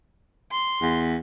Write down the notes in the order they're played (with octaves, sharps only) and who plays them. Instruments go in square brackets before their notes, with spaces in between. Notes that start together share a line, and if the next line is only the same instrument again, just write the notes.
[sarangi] C6
[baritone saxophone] E2